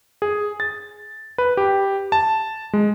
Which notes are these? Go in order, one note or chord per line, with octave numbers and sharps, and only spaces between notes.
G#4
A6
B4
G4
A5
G#3